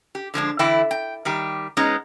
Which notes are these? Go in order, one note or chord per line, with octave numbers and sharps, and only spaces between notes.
G4
D3 F3 G#3 D4
D3 E3 E4 A4 G5
G5
D#3 G3 G4
G#3 B3 C#4 D#4